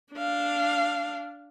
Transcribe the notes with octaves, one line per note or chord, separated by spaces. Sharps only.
D4 F5